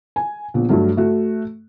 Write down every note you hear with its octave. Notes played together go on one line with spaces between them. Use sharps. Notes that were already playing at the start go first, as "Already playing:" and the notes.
G#5
A#1 B3
G2 F#3 A3
A3 F#4